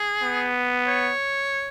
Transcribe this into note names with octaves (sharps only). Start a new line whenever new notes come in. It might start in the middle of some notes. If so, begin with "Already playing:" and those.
Already playing: G#4
B3
C#5